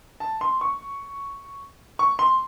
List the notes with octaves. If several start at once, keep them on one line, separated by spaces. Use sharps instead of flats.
A5
C6
C#6
C#6
C6